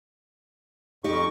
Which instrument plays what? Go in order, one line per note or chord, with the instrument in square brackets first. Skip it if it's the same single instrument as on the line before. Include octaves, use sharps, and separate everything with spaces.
[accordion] F2 C#6 [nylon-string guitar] D#4 G4